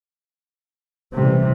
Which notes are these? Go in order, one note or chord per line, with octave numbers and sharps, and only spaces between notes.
C3 E3 G3 A3